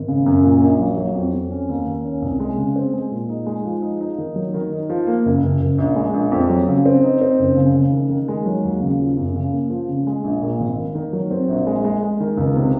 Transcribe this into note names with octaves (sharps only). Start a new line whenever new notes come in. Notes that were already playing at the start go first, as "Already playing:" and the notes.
Already playing: G#1
C#3
F#2
A#2
A#1
F#3
F#3
F2
F2
C#4
D#2
D#2
C#4
C2
G#3
C#3
C4
G#3
A#2
D#4
G#3
F3
D#4
D#4
D#3
F#3
D#3
D#4
F3
A#3
F#1
F#1
F#1
A#1
G#3
A#1
F2
F#3
C#3
C4
D#4
C4
F#1
C#3
C#3
D#3
D#3
G#3
F#3
D#2
C#3
F3
F#2
C#3
A#3
F3
C#3
G#3
A#1
A#2
G#1
D#3
D#3
F#3
C4
A#1
G#3
G#3
G#3
D#3
C#2
C3